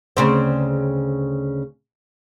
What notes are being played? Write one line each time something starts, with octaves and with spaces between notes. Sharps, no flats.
D2 C#3 C4